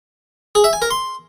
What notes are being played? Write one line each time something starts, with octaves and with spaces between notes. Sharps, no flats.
G#4
E5
G#5
A#4
C6